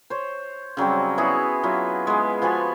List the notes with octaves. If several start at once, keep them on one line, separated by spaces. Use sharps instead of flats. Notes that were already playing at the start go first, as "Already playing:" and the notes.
C5 C#5
C#3 F#3 G3 C4
B3 E4 F#4 G#4
F#3 E4 F4 B4
G#3 B3
F3 B3 F#4 G#5